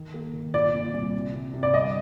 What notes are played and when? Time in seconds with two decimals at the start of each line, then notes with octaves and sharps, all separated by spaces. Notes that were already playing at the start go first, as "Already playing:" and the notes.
Already playing: D#3
0.14 A#3
0.33 D#3
0.54 A#2 D5
0.75 A#2
0.94 C2
1.13 C3
1.34 C3
1.54 C3
1.63 D5
1.74 G1 D#5